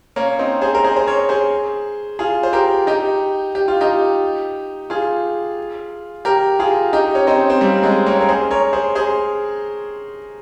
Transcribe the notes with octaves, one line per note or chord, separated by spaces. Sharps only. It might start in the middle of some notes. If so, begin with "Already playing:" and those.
A#3 C#4
C4 D#4
G#4 C5
A#4
G#4 C5
C5
A#4 C#5
G#4 C5
F4 G#4
C5
G4 A#4
D#4 G4
G4
F4
D#4 G4
F4 G#4
G4 A#4
F4 G#4
D#4 G4
C#4
C4 D#4
C4
G3 A#3
A#3
G#3 C4
A#3 C#4
A#4
G#4 C5
A#4 C#5
G#4 C5
G#4 C5